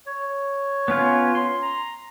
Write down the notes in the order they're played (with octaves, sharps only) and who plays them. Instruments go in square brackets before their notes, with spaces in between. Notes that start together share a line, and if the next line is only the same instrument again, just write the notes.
[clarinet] C#5
[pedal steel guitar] B3 C#4 F4
C6
[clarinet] A#5